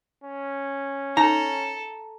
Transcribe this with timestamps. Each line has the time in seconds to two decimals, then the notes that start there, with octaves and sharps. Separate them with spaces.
0.24 C#4
1.17 D#4 A4 A#5